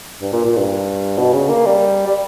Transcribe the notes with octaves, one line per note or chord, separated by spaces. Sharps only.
G2
A#2
A#2
G2
B2
C#3
A#3
G3
G3